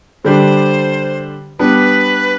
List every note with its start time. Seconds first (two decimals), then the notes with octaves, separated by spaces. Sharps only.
0.24 D3 G3 D4 C5
1.59 G3 B3 D4 B4